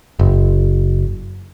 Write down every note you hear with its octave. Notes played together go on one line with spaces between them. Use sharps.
F#1